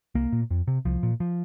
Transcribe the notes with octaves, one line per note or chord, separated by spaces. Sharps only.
C2 A#3
A#2
F2
C3
C2 F3
A#2
F3